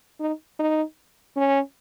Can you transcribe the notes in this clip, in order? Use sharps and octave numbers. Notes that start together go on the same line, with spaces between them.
D#4
D#4
C#4